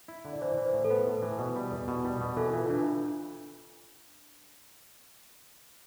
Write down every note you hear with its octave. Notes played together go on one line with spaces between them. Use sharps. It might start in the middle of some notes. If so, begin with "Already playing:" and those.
E4
D3
D5
E3 C5
E3
C5
A2
A4
B3 B4
A2
E3
B2
G3
E2
B2
G3
B2
E3 A4
E3 F4
E3 D4